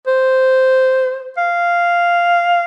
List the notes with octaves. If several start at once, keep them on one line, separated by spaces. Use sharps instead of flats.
C5
F5